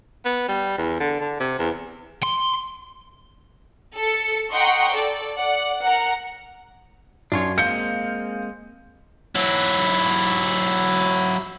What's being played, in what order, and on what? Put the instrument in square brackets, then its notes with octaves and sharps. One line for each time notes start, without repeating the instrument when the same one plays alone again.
[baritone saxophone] B3
G3
E2
D3
D3
C3
E2
[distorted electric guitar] C6
[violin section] A4 C#7
D#5 F#5 G5 A#5 C6 C#6
A4 D5
D5 F#5
A#4 F#5 A#5
[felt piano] F#2 [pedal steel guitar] D4 F4 C#5
[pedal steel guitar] G#3 A#3 C4 [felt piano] F5 G6 C#7
[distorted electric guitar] F#3 E4